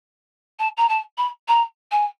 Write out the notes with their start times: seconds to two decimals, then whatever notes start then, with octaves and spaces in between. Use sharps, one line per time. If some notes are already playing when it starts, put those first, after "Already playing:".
0.58 A5
0.76 A#5
0.88 A5
1.17 B5
1.47 A#5
1.91 G#5